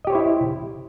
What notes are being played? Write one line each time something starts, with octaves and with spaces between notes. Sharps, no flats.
E4 G4 C5 C#5 D#5